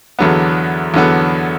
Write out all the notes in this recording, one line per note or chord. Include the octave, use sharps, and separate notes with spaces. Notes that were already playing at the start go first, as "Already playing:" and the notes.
E2 D3 F#3 B3
E2 D3 F#3 B3